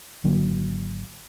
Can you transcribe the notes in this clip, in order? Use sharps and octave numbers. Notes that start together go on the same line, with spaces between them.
G#1 D3 F#3 A#3